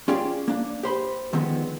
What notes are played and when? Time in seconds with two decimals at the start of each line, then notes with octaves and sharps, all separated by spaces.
0.08 C#4 F4 G4 G#4 D5
0.48 A#3 D4
0.83 G4 C5 B5
1.33 D3 D#3 F3 G#3 B3 C4